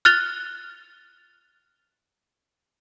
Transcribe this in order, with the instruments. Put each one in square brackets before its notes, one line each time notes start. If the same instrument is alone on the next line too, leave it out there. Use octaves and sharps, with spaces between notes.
[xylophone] F6 F#6 A6 F7 G7